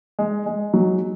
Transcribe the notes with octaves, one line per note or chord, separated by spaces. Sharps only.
G#3
G#3
F#3